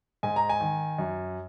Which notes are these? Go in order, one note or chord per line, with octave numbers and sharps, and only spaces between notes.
G#2 G#5
A#5
G#5
D#3
F#2